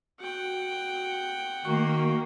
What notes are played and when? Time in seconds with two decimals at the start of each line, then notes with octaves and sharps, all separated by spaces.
0.20 F#4 F#5 G5
1.65 D#3 A#3 F#4 C#6